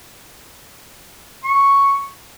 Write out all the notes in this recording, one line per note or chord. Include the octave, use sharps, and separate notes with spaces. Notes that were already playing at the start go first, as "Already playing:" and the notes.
C#6